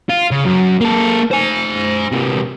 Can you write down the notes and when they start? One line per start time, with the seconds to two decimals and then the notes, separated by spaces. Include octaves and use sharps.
0.09 F4
0.31 C#3
0.45 F#2
0.80 A#3 A4
1.31 C5 G#5
2.11 C3 A#3